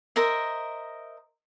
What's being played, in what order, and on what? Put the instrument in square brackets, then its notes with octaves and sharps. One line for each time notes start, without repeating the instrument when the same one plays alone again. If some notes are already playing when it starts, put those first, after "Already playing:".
[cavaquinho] A#4 C5 D#5 E5